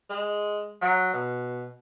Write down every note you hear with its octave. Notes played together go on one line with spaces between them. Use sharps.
G#3
F#3
B2